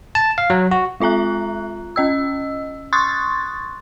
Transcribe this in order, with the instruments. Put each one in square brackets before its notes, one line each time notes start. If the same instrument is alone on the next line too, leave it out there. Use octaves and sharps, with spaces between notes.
[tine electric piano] A5
F5
F#3
F#4
[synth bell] G#3 F4 E5 A#5 F#6
C#4 D#5 E6
C6 C#6 D#6 F#6 G#6 A6